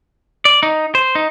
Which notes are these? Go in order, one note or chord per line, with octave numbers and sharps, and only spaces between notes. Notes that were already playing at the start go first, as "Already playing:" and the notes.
D5
D#4
C5
D#4